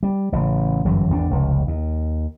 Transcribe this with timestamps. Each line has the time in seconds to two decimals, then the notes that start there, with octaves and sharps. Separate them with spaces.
0.03 G3
0.32 A1 A2 C#3
0.85 G1 F#2 E3 F#3
1.10 G#1 E2 C#4 D4
1.30 F1 C#2
1.67 D#2